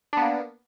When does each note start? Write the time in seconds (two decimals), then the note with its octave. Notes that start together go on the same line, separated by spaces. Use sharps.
0.13 D4
0.17 B3
0.21 A#3